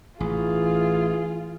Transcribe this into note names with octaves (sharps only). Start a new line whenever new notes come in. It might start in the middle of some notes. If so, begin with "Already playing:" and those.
A1 E3 F4 G#4